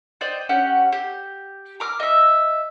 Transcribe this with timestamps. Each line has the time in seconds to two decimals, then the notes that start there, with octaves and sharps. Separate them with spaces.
0.21 C5 D5 D#5 G5
0.49 C#4 G4 F#5
0.92 G4
1.80 A#5 D6 F6
2.00 D#5 E5